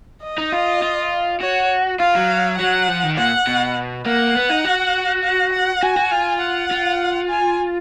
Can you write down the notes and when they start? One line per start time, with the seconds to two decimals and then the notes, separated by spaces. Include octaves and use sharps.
0.23 D#5
0.38 D#4
0.52 F4
0.82 F4
1.41 F#4 C#5
2.00 F4 F5
2.15 F#3
2.58 F#3 F#5
2.88 F3
3.04 D#3
3.17 A#2 F#5
3.47 B2
4.06 A#3 F#5
4.36 B3
4.49 D#4
4.65 F#4
5.24 F#5
5.53 F#5
5.83 F#4 G#5
5.97 F#4
6.12 F4
6.41 F#5
6.71 F4
7.29 G#5